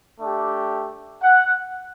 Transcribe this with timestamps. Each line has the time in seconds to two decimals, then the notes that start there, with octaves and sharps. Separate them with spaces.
0.20 A3 D4 G4
1.23 F#5